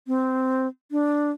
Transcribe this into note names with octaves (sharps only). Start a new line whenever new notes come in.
C4
D4